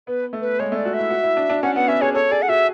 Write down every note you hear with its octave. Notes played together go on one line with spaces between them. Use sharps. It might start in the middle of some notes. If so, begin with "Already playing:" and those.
B3 B4
A3
B4
G#3 C#5
A3 D5
F#4
E5
E4
F#4
E4
D4
D4
C#4 F#5
B3 F#5
C#4 E5
G#4 C#5
A4 C#5
G#4 D5
F#5
F#4 E5